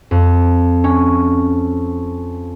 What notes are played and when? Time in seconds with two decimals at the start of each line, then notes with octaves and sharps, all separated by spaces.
0.11 F2
0.84 C#4